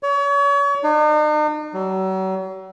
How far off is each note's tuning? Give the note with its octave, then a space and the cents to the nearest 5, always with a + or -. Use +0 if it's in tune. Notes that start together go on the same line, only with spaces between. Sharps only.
C#5 +35
D#4 -45
F#3 +40